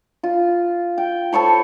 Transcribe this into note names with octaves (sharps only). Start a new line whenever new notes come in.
F4
G5
A4 C5 C#5 B5